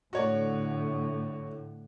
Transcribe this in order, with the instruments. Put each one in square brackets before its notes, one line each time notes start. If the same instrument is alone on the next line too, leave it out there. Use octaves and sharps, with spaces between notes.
[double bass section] A2 D3 [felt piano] F#4 C#5 D5